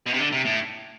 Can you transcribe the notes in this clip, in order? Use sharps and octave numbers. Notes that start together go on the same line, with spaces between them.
B2
C3
D3
C3
A2